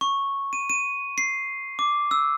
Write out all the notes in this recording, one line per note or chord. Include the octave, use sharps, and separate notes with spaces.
C#6
D#7
D#7
C7
D6
E6